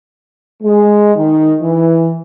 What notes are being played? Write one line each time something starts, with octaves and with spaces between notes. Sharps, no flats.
G#3
D#3
E3